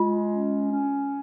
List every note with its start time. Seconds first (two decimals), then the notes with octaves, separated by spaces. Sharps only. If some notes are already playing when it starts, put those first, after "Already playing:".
Already playing: G#3 F4
0.30 C#4
0.71 C#4